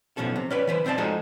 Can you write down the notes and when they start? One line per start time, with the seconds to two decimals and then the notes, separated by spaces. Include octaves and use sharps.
0.17 B1 B2 F3 C#4 A4
0.36 C3
0.50 C#4 B4 D5
0.67 E3 B4 C5
0.85 B1 C4 C5 D5 A5
0.98 F3 G#3 D#4 F#4 G#4 A4